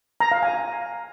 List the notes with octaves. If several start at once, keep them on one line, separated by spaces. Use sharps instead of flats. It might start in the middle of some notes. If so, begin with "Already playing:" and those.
A#5
F5
G#5